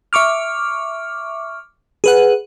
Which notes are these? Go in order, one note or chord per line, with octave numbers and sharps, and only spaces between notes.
E5 C#6 D6 F6
G#4 B4 F#5